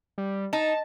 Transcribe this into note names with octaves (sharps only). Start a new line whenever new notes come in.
G3
D#4 A5